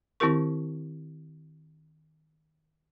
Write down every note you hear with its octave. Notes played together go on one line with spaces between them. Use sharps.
D#3 C4 E4 G4 A#4 C#6